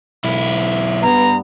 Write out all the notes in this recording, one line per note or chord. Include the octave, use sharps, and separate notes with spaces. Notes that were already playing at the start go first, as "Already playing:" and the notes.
B1 E4
G2 B3 A#5